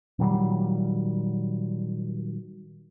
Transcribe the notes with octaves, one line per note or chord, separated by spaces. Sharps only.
A#2 D#3 F#3 G3